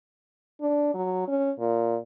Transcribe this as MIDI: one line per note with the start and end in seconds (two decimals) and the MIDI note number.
0.61 0.90 62
0.94 1.26 54
1.28 1.51 61
1.59 1.97 46